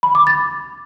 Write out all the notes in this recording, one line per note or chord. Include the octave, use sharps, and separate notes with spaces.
B5
D6
A6